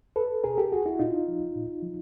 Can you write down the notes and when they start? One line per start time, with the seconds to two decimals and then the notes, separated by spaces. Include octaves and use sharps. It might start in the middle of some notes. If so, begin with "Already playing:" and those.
0.16 A4 B4
0.44 B2 G#4 A#4
0.58 G4 A4
0.72 F#4 G#4
0.86 E4 F#4
0.99 A#2 D#4 F4
1.28 F3
1.56 A#2
1.83 F3